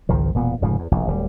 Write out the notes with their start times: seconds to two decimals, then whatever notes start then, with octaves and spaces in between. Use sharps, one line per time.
0.09 G#1 C#2 D#3 F3
0.34 E1 A#2 B3
0.62 F1 G#2 C#3 F3
0.79 E2
0.91 F1 A#1 E2
1.07 D1 G3